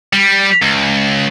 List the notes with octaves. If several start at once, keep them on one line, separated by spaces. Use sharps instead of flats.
G3
C#2